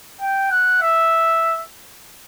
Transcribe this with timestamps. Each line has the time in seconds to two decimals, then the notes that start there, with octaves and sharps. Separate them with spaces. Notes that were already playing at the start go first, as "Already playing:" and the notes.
0.21 G5
0.51 F#5
0.82 E5